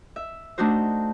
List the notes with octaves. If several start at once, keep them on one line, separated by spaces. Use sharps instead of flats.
E5
A3 D4 D#4 F#4 C5